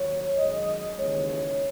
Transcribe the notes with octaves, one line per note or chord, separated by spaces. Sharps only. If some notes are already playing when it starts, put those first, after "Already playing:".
Already playing: D#2 F#3 C#5
F#2 D#3 G#3 D#5
D#2 C#3 E3 G#3 C#5